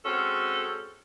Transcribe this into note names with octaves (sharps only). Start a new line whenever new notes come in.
G#3 C4 C#4 F#4 A4